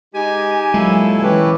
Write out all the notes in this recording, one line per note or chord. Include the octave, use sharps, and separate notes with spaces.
G#3 D#4 G4 G#5
A#2 F#3 G#3 E4 A4
E3 C#4 G4 B4